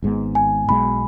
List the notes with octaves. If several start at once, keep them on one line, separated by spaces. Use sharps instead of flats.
G#1 G#2 G#3 B3
G#5
B1 B2 G#3 B3 B5